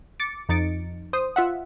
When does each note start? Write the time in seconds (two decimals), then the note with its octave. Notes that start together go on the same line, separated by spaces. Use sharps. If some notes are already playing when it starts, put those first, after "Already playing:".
0.20 D6 A6 C#7
0.49 F2 D#4 A6 C#7 D7
1.13 C5 D#6
1.36 F4 E5 F#5